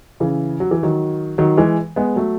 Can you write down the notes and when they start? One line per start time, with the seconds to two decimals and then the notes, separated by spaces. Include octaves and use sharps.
0.20 C#3 E3
0.60 F#3
0.71 E3
0.83 D#3 F#3
1.38 D#3 F#3
1.57 E3 G#3
1.96 G#3 B3
2.16 F#3 A3